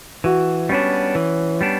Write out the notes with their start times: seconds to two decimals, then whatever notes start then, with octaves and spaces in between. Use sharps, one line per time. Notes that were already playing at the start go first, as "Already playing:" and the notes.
0.24 E3 F#4
0.69 G3 B3 C#4 D4
1.15 E3
1.61 G3 B3 D4